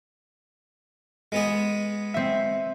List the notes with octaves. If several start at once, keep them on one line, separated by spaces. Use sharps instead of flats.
G#3 B3 G#4
C4 E5